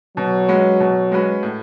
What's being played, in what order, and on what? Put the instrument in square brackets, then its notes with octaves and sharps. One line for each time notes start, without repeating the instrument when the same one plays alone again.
[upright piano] B2 [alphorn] F#3
[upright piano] G#3 C#4 F#4 B4
B2
G#3 C#4 F#4 B4
A2